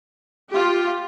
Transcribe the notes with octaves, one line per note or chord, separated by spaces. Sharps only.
F4 G4